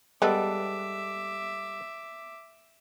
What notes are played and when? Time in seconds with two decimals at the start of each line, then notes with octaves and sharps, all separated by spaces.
0.22 G3 G#3 B3 A4 B4 E5 D6